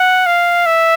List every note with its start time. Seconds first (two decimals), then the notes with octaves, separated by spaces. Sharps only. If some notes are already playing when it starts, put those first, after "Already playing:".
Already playing: F#5
0.26 F5
0.66 E5